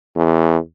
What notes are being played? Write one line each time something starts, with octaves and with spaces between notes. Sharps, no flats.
E2